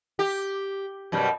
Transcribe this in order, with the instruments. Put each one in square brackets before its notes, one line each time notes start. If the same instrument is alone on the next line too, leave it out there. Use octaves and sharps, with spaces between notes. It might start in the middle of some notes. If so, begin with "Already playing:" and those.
[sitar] G4
F#2 B2 G3